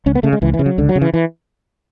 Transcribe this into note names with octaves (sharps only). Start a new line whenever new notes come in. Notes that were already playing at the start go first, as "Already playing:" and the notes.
C#2 C#4
B3
C#3 A3
G#3
C#2 E3
E3
C#3
F#3
C#2 D3
F#3
C#3
E3
E3